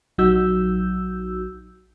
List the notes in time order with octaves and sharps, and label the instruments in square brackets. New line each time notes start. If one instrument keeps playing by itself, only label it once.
[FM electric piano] A#1 F#3 D#4 F#4 E6 G6